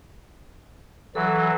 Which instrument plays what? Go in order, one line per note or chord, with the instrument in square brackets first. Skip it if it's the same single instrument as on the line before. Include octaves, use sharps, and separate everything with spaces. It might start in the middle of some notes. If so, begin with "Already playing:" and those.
[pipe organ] E3 F#3 [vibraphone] A4